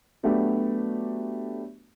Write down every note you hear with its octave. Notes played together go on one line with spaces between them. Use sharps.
F#3 A3 B3 D4 F#4 G4